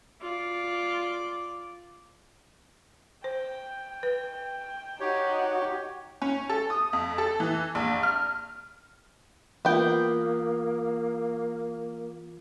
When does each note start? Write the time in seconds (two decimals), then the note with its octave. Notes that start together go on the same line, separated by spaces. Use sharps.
0.21 F4 D5
3.24 C5 G5
4.03 B4
5.00 D#4 F#4 G4 C#5
6.22 C#4
6.49 A4
6.70 D#6
6.93 F2
7.18 A4
7.40 E3
7.75 A#1
8.03 F6
9.65 E3 A#3 B3 F4 G5